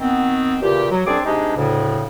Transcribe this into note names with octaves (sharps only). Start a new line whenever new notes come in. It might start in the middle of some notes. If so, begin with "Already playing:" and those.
D#3 B3 C4
E2 A#2 C#3 G4
F#3
F#2 C4 D4 G#4 D5 D6
C3 G#3 D4 D#4 G4 G#4
D2 A2 C#3